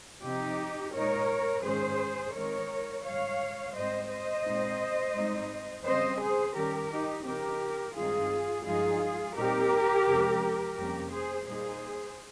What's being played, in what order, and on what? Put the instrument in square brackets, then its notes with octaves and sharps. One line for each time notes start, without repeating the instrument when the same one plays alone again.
[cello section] C3 F3 C4 D#4 G4
A#2 G#3 D#4 A#4 C#5
G#2 D#3 G#3 C#4 G#4 C5
D#3 G#3 C4 D#4 A#4 C#5
G#2 D#3 G3 C#5 F5
G#2 G3 C4 C5 D#5
C5 D#5
A#2 G#3 C4 D#4
G#2 G3 C4 D#4
C#3 G3 C4 C5 D#5
G#4 C5
D#3 G3 C#4 G4 A#4
D#4 G4
C#3 F3 C4 D#4 G4 A#4
G2 D#3 G#3 C4 D#4 F4 G#4
G2 F3 G#3 D#4 F4 G#4
A#2 G3 C4 D#4 G4 A#4
F2 C3 F3 G#3 C#4
F2 C3 G3 A#3 C#4 G4 A#4
G#4 C5
A#2 G3 A#3 D#4 G#4 C5